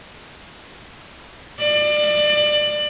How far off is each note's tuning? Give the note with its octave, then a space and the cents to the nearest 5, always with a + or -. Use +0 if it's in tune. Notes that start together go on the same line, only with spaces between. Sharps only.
D5 +25